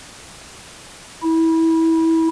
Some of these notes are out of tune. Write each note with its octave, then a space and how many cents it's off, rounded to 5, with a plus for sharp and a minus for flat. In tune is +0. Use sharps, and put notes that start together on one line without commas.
E4 -20